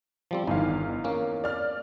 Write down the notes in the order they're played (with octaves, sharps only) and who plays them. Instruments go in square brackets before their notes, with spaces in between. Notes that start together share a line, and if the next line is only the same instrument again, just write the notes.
[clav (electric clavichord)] F3 G3 C4
[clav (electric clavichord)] G1 [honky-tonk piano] E2 D#3 F5
[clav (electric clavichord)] A#3 C#4
[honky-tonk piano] D5 F6